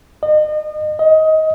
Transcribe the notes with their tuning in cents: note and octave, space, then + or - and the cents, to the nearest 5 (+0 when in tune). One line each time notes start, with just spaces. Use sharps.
D#5 -35
D#5 +20